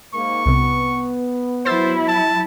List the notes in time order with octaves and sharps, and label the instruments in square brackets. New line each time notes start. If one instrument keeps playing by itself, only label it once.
[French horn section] G#2 A#3 [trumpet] C#6
[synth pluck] C2 C3 [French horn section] B3
[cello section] F#3 E4 [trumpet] C5 [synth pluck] E6 A6 C7
[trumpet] A5